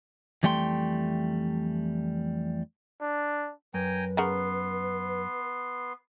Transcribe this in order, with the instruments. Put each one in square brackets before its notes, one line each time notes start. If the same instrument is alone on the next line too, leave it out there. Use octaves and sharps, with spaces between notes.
[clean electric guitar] F2 E3 G3 A3 G5 C6
[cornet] D4
[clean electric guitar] F#2 [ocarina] B4 [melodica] G5 G#5 A#5
[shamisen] C#3 A#4 F#5 [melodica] B3 C6